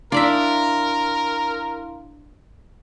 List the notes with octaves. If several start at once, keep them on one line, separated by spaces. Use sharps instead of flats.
D4 E4 A#4 D5 E5 F5 C6